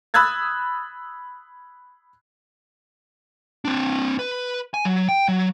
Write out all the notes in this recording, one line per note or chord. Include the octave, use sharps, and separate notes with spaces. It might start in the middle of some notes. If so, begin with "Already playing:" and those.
B5 D#6 E6 F#6 G#6 A6
C4 D4
B4
G#5
F#3
G5
F#3